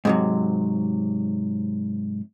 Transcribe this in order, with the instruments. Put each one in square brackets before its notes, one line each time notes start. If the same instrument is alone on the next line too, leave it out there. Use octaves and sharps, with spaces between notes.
[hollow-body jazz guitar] G#2 C3 F#3